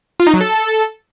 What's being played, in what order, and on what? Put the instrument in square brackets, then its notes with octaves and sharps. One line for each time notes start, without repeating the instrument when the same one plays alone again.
[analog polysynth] F4
D#4
F#3
A4